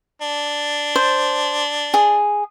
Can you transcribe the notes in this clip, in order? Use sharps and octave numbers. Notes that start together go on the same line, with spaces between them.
D4
C5
G#4